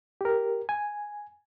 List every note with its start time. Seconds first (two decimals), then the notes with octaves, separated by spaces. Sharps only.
0.21 G4 A#4
0.69 G#5